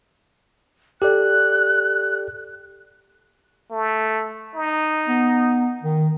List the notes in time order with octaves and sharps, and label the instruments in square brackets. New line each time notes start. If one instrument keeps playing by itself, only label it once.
[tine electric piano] G4 A4 D5 [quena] F#6
[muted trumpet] A3
D#4
[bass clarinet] B3
D#3